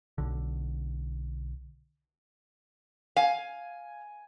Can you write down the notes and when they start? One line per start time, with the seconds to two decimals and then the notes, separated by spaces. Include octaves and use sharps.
0.18 B1 D3
3.16 F5 G#5